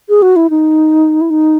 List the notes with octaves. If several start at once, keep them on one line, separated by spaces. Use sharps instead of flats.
G#4
F#4
E4
D#4
E4
D#4